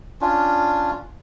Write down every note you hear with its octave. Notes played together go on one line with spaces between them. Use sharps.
C#4 D4 F4